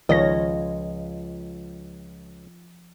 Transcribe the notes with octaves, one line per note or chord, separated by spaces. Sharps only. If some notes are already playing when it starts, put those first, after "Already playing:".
C#2 D#3 F3 F4 C#5 D#5 G#6 A#6